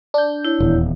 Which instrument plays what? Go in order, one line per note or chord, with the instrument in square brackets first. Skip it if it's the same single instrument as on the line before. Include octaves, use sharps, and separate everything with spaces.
[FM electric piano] D4 G6
[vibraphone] E4 C#5
[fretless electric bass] D#1 E2